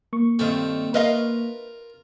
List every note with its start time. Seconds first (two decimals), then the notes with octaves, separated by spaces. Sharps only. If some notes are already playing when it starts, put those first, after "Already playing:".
0.13 A#3 C#6
0.39 G2 D#3 A3 C4 F4
0.94 F4 A#4 B4 D#5 F5